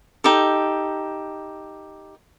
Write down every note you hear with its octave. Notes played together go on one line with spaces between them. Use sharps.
D#4 G4 A4